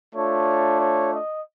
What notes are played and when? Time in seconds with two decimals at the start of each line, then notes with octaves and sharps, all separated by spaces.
0.15 A3 D4 F4 C#5
0.81 C#5
1.13 D#5